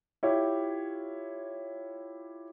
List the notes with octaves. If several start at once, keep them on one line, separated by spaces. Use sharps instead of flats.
E4 F4 G4 C#5